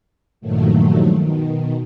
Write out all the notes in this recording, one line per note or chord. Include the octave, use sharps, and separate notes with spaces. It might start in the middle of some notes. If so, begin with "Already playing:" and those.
G2 A#2 D#3 F3 F#3 A3
B2 D#3